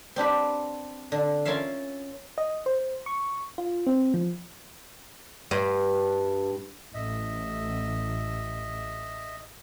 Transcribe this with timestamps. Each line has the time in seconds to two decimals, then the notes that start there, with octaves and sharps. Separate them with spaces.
0.16 C4 D4 G4 B4
1.12 D3
1.45 C#4 F4 A#4 C#5 E5 F5
2.38 D#5
2.66 C5
3.06 C#6
3.58 F4
3.87 C4
4.14 F3
5.51 G2
6.94 A1 D#5 E5